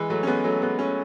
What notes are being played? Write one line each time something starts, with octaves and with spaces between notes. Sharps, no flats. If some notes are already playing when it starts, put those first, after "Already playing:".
Already playing: E3 G#3
F#3 A3
C#4
G#3 B3
F#3 A3
G#3 B3
A3 C#4